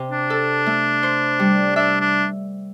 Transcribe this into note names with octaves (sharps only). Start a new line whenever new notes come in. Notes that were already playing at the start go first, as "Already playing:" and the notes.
Already playing: C3
D4
A4
A3
C5
G3
D4 E5
D4